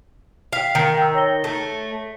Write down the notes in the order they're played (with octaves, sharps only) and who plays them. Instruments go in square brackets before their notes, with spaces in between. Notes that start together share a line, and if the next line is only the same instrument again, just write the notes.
[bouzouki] F5 [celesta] G5 B6 C7
[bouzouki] D#3
[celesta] G5 A#5 E6
C#5 A#6 G7
[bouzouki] A3